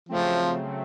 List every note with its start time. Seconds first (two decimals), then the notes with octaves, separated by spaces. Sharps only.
0.09 C#3 F3 F#3 A3 C4